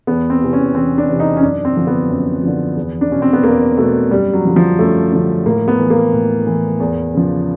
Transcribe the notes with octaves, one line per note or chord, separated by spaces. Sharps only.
E2 B3
C4
C3 E3
C#4
E2 C4
D4
C3 E3
D#4
C#4
F#2 D4
C4
D3 F3
B3
F#2
D3 F3
E2
D4
B2 C#4
C4
B3
E2 A#3
B2 A3
F#2 G3
F#3
D3 F3
F3
F#2 A3
D3 F3
A2 A#3
B3
E3
A#3
A2
E3
E2
C#3 F3